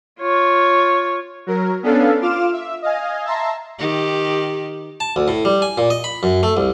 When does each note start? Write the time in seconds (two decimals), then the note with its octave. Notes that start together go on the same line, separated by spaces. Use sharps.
0.20 F4 C#5
1.47 F#3 A#4
1.83 B3 C#4 D4 A4 F5
2.22 F4 F5 D6 F6 E7
2.53 E5
2.82 D#5 F5 G#5
3.25 E5 A5 A#5 C6
3.78 D#3 G4
5.00 A5
5.16 D2
5.28 A2
5.45 G3
5.62 G#5
5.78 A#2
5.90 D#5
6.04 B5
6.23 F#2
6.43 A3
6.57 C2